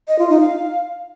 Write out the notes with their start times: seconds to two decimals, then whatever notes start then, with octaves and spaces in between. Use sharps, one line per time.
0.08 D#5
0.19 F4
0.30 D#4
0.40 F5